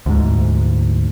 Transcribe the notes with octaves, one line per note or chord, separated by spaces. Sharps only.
D2 G#2